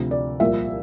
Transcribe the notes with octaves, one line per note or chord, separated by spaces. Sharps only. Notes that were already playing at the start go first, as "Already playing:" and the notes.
Already playing: D2 C3 F3
D5
C2 A#2 F3 E5